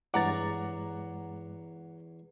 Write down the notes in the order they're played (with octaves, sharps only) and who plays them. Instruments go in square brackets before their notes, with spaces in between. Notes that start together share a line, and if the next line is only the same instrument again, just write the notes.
[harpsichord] E2 C#5 [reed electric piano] G2 G#3 D6 [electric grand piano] F#5 A#5 A6